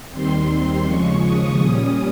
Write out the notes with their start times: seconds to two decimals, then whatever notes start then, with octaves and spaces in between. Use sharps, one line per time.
0.10 D#2 D#3 G3 C4 C6
0.85 D#2 C#3 F3 G#3 C#6
1.22 D#6
1.58 A#2 G3 C#4